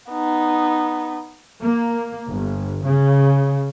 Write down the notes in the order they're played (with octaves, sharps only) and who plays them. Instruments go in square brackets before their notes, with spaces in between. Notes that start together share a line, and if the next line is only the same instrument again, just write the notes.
[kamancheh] B3 D#4
[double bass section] A#3
G1
C#3